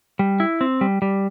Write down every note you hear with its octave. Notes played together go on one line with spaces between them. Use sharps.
G3
E4
C4
G3
G3